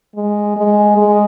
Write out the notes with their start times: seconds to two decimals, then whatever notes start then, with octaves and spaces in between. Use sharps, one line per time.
0.15 G#3
0.56 G#3
0.97 G#3